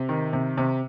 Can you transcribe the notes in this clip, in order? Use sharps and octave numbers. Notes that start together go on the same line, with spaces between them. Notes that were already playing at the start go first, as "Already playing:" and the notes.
Already playing: C3
D#3
C3
C3